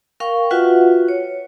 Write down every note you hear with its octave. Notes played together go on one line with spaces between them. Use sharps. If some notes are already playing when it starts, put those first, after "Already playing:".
A#4 F5 G5 C#6
F4 F#4 B4 E5 F#5
C#5